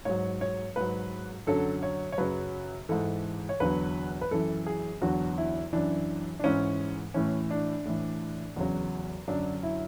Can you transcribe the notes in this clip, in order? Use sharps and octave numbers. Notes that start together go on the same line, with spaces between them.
G#2 F#3 C#5
C#5
G#2 F#3 B4
F#2 D3 F#3 A4
C#5
C#5
F#2 C#3 F#3 B4
G#2 E3 A4
C#5
E2 D3 F#3 B4
B4
F#2 E3 A4
G#4
E2 D3 F#3 F#4
E4
F#2 E3 D4
D4
G#2 E3 C#4
A2 E3 C#4
D4
A2 E3
E2 C#3 F#3
F#2 D3 F#3 D4
E4